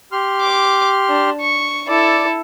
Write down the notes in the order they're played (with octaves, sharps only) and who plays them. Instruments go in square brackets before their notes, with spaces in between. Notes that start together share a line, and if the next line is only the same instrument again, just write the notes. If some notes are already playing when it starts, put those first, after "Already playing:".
[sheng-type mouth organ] G4 C6 F6
[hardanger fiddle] D6
D4
C#6
[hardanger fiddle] E4 A4 [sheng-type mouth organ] D5